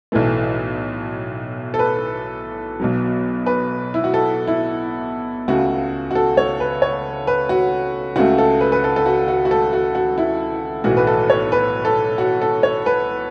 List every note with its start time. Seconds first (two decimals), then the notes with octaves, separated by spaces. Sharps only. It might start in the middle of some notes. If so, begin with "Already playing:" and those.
0.12 B1 A2 E3 A3
1.74 A4
1.79 B4
2.80 B1 B2 F#3
3.46 B4
3.94 E4
4.04 F#4
4.14 A4
4.47 E4
5.48 C#2 C#3 A3 F#4
6.11 F#4
6.15 A4
6.37 C#5
6.60 B4
6.82 C#5
7.27 B4
7.49 F#4
8.16 C#2 C#3 A3 F#4
8.38 A4
8.61 B4
8.72 B4
8.84 A4
8.96 A4
9.06 F#4
9.28 F#4
9.45 F#4
9.51 A4
9.73 F#4
9.95 F#4
10.18 E4
10.84 B1 A2 E3 F#4
10.97 B4
11.07 A4
11.30 C#5
11.52 B4
11.85 A4
12.18 F#4
12.42 A4
12.63 C#5
12.86 B4